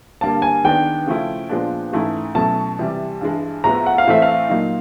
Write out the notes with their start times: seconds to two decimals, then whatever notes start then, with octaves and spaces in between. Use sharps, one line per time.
0.21 G2 D3 G3 A#3 A5
0.42 G#5
0.64 D#3 G#3 B3 D4 G5
1.07 C#3 F3 A3 C#4 E4
1.49 A#2 F3 G#3 B3 D4
1.93 G#2 E3 A3 C#4 E4
2.35 B2 F#3 A3 C#4 E4 A5
2.79 C3 E3 G3
3.21 G2 E3 G#3
3.64 A2 F3 G#3 B3 A#5
3.86 F#5
3.98 F5
4.07 A2 E3 A3 C4 E5
4.22 F5
4.49 A#2 F#3 A#3 D#4